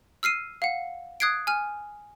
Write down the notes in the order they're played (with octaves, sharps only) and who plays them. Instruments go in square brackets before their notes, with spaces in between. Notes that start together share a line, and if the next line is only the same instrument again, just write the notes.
[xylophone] E6 F6 C7 D#7
F5 F#5
D#6 F#6 G#6 C7 D7
G#5 F6